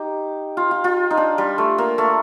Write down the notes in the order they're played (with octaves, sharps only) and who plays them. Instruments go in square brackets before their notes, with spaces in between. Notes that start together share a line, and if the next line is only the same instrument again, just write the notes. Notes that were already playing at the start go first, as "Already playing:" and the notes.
Already playing: [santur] D#4 G4
F4
F4
F4
D#4
D4
G3
A3
A#3
A3